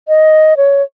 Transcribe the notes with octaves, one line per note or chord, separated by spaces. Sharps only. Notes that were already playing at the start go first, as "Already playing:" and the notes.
D#5
C#5